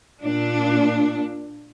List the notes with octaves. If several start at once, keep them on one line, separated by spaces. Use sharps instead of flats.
A#2 D4